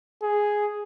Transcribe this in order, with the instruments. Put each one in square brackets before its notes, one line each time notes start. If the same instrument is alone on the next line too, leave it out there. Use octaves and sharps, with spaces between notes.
[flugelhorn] G#4